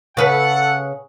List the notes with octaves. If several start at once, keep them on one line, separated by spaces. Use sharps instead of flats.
C#3 A4 B4 F#5